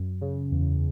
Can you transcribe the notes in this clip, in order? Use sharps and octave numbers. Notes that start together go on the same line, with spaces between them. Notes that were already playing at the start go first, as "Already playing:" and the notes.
Already playing: F#2
C#3
E2